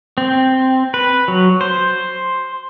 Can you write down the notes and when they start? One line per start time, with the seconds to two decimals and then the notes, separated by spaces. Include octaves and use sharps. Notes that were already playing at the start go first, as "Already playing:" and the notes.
0.18 C4
0.94 B4
1.28 F#3
1.61 C5